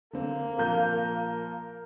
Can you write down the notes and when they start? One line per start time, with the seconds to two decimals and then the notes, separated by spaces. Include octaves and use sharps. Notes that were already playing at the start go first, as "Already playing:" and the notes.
0.13 D3 A#3 C4
0.58 A#2 F3 A#4 A#5 G6